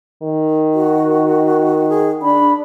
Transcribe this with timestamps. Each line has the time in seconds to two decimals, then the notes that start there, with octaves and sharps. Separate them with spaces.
0.22 D#3
0.74 F#4
1.89 G#4
2.22 D4 B5